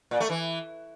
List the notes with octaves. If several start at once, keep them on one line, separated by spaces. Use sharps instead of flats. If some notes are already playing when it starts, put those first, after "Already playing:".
A#2
A3
E3